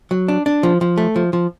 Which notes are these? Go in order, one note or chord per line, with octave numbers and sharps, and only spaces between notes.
F#3
D4
D4
F3
F3
A3
F3
F3